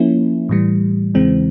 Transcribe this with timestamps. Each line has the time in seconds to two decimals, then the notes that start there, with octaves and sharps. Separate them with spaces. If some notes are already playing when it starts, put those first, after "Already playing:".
Already playing: F3 A#3 C#4 E4
0.49 A2 E3 G3
1.14 E2 C#3 E3 G#3 C4